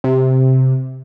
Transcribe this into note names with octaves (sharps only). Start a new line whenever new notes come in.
C3